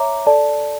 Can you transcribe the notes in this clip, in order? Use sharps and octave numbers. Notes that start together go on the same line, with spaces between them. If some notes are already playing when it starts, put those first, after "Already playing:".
Already playing: C#5 E5 A#5 D6
A4 D5 A5